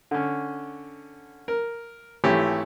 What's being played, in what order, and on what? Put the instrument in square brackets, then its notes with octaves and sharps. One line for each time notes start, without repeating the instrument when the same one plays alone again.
[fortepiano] D3 C#4
A#4
G#1 E3 A3 E4 G4 C#5